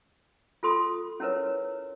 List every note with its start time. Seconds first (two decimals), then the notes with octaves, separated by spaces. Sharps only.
0.63 F4 A4 C6 D#6
1.20 C#4 E4 A#4 B4 C#5